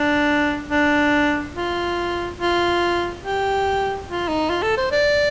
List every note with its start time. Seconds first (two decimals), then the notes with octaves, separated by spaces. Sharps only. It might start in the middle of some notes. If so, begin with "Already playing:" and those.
Already playing: D4
0.70 D4
1.54 F4
2.38 F4
3.23 G4
4.08 F4
4.28 D#4
4.50 F4
4.63 A4
4.77 C5
4.92 D5